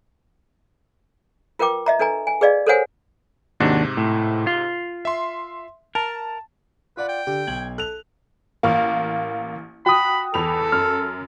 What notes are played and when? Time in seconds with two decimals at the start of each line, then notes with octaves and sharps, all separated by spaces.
1.59 F4 A#4 B4 G5 D6
1.86 D#5 E5 A#5
1.99 D4 A4 B4 G#5 A#5
2.27 G#5
2.41 G#4 B4 D5 D#5 F5
2.67 A4 A#4 C5 C#5 F#5 G#5
3.60 D#2 G#2 C3 D4 F#4
3.97 A2
4.47 F4
5.05 E5 C6
5.95 A#4 A5
6.97 F4 B4 D5 F#5
7.09 G5
7.27 D3 G4
7.47 B1 G#6 F#7
7.78 A4 F#6 F7
8.63 A1 A#3 F5
9.86 F#4 G5 B5 D#6
10.34 E2 A4 B5 F7
10.72 F#2 F6